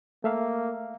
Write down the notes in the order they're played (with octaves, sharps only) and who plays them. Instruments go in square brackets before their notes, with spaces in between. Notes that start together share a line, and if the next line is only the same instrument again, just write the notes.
[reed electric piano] A3 E5 F5 [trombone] A#3